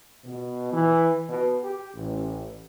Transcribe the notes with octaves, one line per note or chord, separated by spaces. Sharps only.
B2
E3
B2
G4
A1